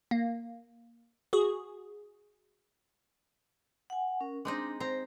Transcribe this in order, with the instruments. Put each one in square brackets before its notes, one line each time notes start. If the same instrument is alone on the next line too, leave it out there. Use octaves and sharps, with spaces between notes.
[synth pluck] A#3
F#4 G#4
[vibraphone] F#5 G#5
C#4 A#4
[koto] G#3 C4 D#4 [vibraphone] D4
[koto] C4 A#5 [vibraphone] C5